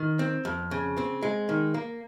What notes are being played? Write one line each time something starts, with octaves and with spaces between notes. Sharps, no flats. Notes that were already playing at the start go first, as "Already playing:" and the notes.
Already playing: D#3
C4
F2
C#3
C4
G#3
D#3
A#3